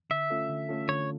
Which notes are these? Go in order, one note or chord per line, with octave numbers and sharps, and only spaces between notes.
D3 E5
A3 C#4 F4 A4
D3
A3 C#4 F4 A4
D3 C#5